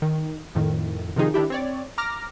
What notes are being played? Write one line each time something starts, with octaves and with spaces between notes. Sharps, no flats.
D#3
F2 A2 D#3
C3 D#3 F3 D#4 G#4
D#3 D4 E4 G4
C4 C#5 D5
A#5 D6 F6 A#6